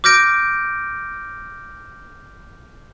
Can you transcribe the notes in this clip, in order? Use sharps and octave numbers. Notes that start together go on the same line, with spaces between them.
D6 F6 G6 A#6 D7